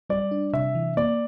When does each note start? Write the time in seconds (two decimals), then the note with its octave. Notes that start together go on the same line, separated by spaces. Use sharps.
0.10 G3 D5
0.31 D4
0.53 C3 E5
0.75 E3
0.97 A#3 D5